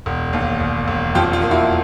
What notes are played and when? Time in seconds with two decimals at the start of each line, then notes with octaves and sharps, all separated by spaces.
0.06 E1
0.33 D#2
0.61 E1
0.88 E1
1.15 F2 F4 G4
1.33 F4
1.42 A#3
1.51 E4 F#4